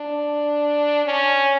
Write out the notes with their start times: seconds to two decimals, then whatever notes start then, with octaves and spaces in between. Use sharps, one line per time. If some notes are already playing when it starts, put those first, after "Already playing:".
Already playing: D4
1.06 C#4